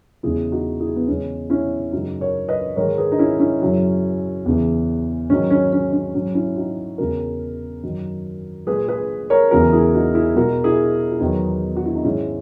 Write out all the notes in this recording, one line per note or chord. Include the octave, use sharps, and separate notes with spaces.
E2 C#3 G#3 E4 G#4
D#4 F#4
E4 G#4
B3
E2 C#3 G#3 C#4
C#4 E4
F#2 C#3 G#3 D#4 F#4
A#4 C#5
B4 D#5
G#2 D#3 G#3 A#4 C#5
G#4 B4
D#4
C#4 E4
C#4 E4
F#2 C#3 F#3
E2 C#3 E3
G#2 D#3 F#3 C#4
C#4
C#4
C#4
G#2 F#3 C#4
C#4 E4
D#4 F#4
E2 C#3 G#3 F#4 A#4
F#2 D#3 F#3
A#2 G#3 G#4 B4
G#4 B4
A#4 C#5
E2 C#3 E3 G#3 F#4 A#4
E4 G#4
D#4 F#4
E4 G#4
B2 G#3 F#4 A#4
E4 G#4
E4
E2 D#3 F#3 B3 D#4
F#4
E4
D#4
G#2 D#3 G#3 C#4 E4